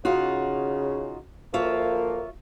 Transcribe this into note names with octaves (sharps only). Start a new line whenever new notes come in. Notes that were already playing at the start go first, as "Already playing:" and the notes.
C#3 D#4 F4 F#4
D2 F3 A#3 F4 C#5 E5